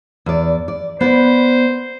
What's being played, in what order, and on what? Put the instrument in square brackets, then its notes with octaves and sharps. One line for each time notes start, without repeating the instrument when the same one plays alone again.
[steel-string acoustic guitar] E2 D5
D5
[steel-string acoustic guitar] B3 B4 D5 [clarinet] C5